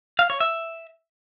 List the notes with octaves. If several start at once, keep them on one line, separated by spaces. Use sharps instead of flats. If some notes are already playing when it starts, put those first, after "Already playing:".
F5
C#5
E5